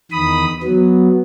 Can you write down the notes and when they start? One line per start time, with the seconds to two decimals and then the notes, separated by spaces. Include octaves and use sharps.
0.12 E2 D#3 B5 D#6
0.63 F#3 B3